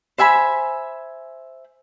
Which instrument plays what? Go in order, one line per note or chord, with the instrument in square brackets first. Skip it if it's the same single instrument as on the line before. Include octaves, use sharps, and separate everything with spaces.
[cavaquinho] C5 E5 G#5 B5